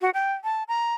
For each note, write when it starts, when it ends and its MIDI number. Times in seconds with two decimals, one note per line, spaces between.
0.01 0.10 66
0.14 0.33 79
0.44 0.63 81
0.68 0.95 82